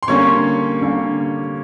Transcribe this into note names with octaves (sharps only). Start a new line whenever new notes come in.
C6
D3 G3 A#3 C#4 C#5 C#6
D3 G3 A#3 C#4